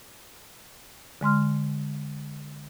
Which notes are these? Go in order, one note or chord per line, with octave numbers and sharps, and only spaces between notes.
D3 G#3 C6 F6